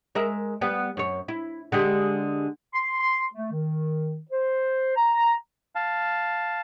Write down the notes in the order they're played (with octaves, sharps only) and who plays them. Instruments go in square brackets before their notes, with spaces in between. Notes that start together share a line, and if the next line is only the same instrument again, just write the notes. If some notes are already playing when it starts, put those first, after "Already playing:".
[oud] G#3 A#4 E5
G3 B3
F#2 C#5
E4
D3 G#3 G4
[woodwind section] C6
C6
A3
D#3
C5
A#5
[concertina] F5 A5